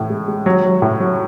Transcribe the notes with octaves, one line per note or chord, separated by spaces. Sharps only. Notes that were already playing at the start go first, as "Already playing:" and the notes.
Already playing: A2 E3
G#3
G#3
F#3
F#3
A2
F#3